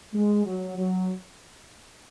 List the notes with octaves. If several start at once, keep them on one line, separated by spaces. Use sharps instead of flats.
G#3
F#3
F#3